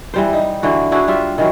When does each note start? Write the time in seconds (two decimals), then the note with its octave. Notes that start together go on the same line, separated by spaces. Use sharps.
0.14 E3 G3 C5
0.33 D#4
0.63 D3 E3 F#4
0.91 D4 E4 F#4 G#4
1.08 G3 F4 E5
1.38 D#3 E3 F#3